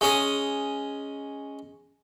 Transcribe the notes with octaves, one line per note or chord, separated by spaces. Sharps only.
G#3 C#4 D#6